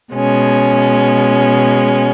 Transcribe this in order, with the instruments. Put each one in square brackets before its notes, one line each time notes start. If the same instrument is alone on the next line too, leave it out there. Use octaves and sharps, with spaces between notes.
[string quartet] B2 G#3 C#4